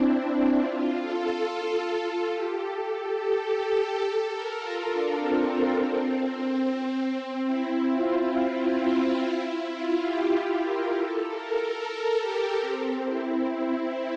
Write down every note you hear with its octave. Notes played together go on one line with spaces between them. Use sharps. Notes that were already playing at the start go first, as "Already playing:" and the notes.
Already playing: C4 D4 E4
F4
A4
A4
G4
A4
A4
G4
A4
A4
A#4
F4
D4
C4
C4
E4
F4
E4
E4
F4
G4
G4
A#4
A4
A#4
A4
G4
C4
E4
E4